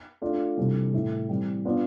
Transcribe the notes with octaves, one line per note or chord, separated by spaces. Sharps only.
A3 D4 F4
C3 E3 G3 D4 A4
A2 E3 A3 E4
E3 G3 C4
B3 D4 F4 B4